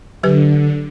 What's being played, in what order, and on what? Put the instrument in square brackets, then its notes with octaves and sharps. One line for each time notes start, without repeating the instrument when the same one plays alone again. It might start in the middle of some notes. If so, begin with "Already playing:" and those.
[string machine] D3 [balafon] F#3 G4 B4